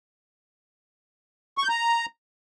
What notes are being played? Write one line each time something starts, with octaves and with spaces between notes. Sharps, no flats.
C#6
G6
A#5